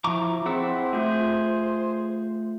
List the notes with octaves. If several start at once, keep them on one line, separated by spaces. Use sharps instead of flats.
F3 E4 A#5 C#6 D6
C4 E4 G#4 C5 F#5 E6
A3 F4 G#4 G6